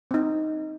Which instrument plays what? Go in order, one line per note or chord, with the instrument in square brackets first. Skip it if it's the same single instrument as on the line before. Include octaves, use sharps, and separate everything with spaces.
[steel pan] C4 D#4